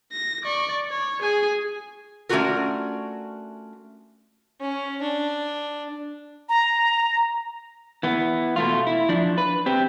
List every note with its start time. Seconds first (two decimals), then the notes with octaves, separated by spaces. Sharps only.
0.12 A#6
0.43 D5 C#6
0.90 C#5
1.22 G#4 G#5
2.29 A3 C#4 D4 F4 F#4 A#4
4.61 C#4
5.02 D4
6.49 A#5
8.03 E3 B3
8.56 B2 A3 F4
8.87 E4
9.09 F3 D4
9.38 B4
9.66 C4 G4